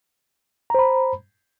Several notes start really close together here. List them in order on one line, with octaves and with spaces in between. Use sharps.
A#5 C5 B5